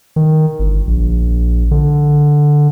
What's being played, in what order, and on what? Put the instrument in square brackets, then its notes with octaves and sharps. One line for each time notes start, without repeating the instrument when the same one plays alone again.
[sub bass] D#3
G1
A#1
D3